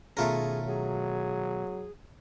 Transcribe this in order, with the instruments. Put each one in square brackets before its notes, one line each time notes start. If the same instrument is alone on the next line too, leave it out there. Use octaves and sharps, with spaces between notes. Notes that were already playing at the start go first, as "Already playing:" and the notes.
[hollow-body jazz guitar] B2 D#3 C#4 [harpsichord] A3 F4 A#4 [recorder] G#4
[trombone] F#3 [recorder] G#4